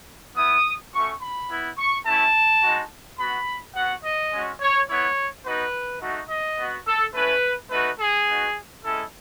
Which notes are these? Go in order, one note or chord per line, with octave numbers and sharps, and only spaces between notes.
B3 E4 D#6
A3 C#4 F#4 C#6
B5
B3 E4
C#6
A3 C#4 E4 A5
G#3 D#4 F#4
B3 F#4 B5
B3 F#4 F#5
D#5
G#3 C#4 F#4
C#5
B3 E4 C#5
B3 D#4 F#4 B4
A3 D#4 F#4
D#5
B3 F#4
A4
A3 C#4 E4 B4
A3 D#4 F#4 B4
G#4
B3 D#4 F#4
G#3 C#4 E4 A4